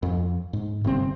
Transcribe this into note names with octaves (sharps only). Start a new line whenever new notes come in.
F2
G#2
G1 C2 C4